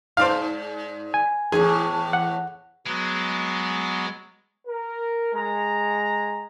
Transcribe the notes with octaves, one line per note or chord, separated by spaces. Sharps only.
G#2 C5 D5 F5
G#5
E2 A2 G#4
F#5
F#3 G#3 B3
A#4
G#3 A#5